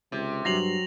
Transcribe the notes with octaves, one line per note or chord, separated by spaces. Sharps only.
C#2 C3
G2 F#3 A#6 C7 F7 F#7